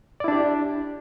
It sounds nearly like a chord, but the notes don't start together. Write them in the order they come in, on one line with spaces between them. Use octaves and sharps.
D5 E4 D4 G4